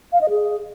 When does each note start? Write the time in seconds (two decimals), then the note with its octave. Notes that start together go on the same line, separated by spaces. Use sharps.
0.12 F5
0.21 D#5
0.30 G#4